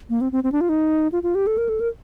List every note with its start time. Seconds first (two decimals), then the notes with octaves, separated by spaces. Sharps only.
0.10 A#3
0.21 C4
0.32 C4
0.44 C4
0.52 D4
0.61 F4
0.69 D#4
1.12 F4
1.23 F4
1.35 G4
1.47 A4
1.58 A#4
1.69 A4
1.80 A#4